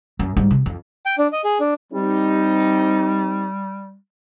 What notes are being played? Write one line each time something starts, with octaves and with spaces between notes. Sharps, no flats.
F#2
G#2 G3
C3
F2
G5
D4
D#5
G#4
D4
G3 C4 D#4 G4